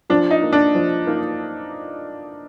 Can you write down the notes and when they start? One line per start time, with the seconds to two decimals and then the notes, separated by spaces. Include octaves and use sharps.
0.10 F3 D4
0.31 D#4
0.42 A#3 D#4
0.53 D4
0.75 F3
1.07 A#3 D#4